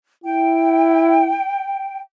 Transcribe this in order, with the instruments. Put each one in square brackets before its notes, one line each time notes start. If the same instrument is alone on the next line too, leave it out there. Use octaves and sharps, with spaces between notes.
[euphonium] E4 [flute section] G5